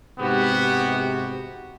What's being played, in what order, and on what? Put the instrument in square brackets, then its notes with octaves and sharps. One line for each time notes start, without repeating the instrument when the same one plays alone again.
[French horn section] G#2 C3 [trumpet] B3 [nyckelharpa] F#4 G4